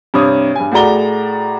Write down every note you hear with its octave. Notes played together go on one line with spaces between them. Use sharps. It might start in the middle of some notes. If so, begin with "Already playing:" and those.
G2 C3 C#5 D#6
G2 G#5
A2 F#4 G#4 D5 A#5 G7